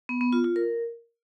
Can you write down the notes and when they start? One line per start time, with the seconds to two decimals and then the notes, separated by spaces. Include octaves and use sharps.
0.09 B3
0.21 B3
0.33 F4
0.44 F4
0.56 A#4